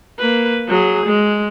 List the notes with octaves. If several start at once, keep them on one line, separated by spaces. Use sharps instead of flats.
A#3 B4
F#3 G#4
G#3